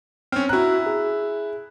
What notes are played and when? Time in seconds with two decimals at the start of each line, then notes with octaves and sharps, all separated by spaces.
0.32 C4 C#4 F6
0.49 E4 F#4 A#5 F#6
0.86 G#4